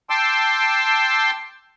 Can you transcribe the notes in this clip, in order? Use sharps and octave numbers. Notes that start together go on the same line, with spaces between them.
G5 A5 C6 D6 E6